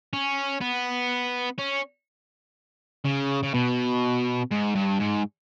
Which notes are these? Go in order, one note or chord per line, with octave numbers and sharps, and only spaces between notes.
C#4
B3
C#4
C#3
C#3
B2
G#2
G2
G#2